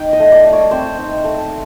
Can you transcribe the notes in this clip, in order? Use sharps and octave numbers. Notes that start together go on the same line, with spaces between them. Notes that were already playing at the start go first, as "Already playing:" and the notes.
Already playing: D#4 G5
D#5
A3
D5
A3
C#5
C4 C5
D#4
A3